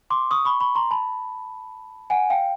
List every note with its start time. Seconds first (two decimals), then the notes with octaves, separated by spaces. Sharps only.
0.10 C6 D6
0.31 C#6 D#6
0.45 B5 C#6
0.60 B5 C#6
0.75 A#5 C6
0.91 A5 B5
2.10 F#5 G#5
2.30 F5 G5